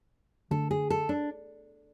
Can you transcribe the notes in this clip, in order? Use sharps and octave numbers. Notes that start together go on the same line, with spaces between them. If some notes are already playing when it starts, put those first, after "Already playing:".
D3 A3 D4 A4
G#4
A4
D4